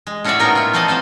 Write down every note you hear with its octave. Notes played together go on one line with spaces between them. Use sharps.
G#3
A2 C#4 F#4 G#4 D5 E5
A#2 B3 D#4 A#4 G5
E4 F4
F3 A3 C4 D5 D#5 A5
E3 C4 C5 D#5